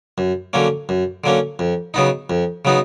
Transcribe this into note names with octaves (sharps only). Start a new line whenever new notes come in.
F#2
D3 F#3 A#3 C#4
F#2
D3 F#3 A#3 C#4
F2
C#3 F#3 B3 D#4
F2
C#3 F#3 B3 D#4